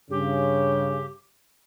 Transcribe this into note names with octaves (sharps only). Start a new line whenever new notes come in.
G2 C#3 G4